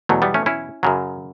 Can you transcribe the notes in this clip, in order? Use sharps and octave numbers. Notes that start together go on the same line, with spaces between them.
E2 B2 F#3 A3
G3 B3
A3 C#4
C#4 E4
F#2 C#3 F#3